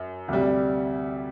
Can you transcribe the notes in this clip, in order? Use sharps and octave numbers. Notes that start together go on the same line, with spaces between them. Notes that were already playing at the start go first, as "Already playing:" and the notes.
Already playing: F#2
D2 C3 G3